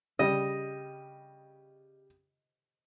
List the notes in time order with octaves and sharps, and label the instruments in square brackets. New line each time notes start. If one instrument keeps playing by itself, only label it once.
[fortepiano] C#3 G3 [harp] D#5